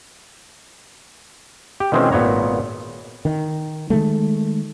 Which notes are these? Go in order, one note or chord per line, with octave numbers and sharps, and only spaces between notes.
G4
B2 D#3 E3 G#3 C4 C#4
G#1 A#2 B3 C#5 A#5
D#3
D#3 E3 G#3 A3